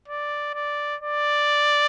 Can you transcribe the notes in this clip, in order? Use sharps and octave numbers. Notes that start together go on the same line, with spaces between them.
D5
D5
D5